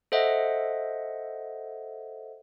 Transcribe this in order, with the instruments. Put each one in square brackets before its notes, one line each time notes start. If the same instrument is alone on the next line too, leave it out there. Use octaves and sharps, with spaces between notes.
[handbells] A4 C5 D#5 E5 F#5